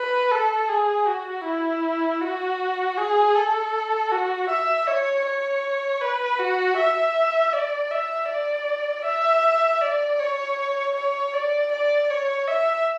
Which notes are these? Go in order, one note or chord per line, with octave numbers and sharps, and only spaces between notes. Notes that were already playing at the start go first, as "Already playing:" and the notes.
Already playing: B4
A4
G#4
F#4
E4
F#4
G#4
A4
F#4
E5
C#5
C#5
B4
F#4
E5
D5
E5
D5
E5
D5
C#5
C#5
D5
D5
C#5
E5